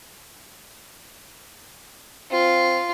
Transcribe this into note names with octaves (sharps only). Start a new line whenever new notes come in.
C4 F4